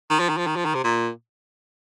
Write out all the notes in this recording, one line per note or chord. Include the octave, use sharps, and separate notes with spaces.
D#3
F3
D#3
F3
D#3
F3
D#3
C3
A#2